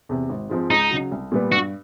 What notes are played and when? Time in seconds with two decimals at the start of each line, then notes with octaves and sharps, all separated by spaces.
0.09 E2 C3
0.29 G#1
0.49 G#2 F3 G#3 C4
0.70 C#2 D#4
0.91 C#3 F#3
1.12 C2
1.32 A#2 G3 B3
1.51 G2 F#4